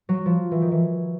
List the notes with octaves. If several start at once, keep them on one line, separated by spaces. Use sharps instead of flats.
F#3
F3
E3
D#3
E3